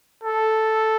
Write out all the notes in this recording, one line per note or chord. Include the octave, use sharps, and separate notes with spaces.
A4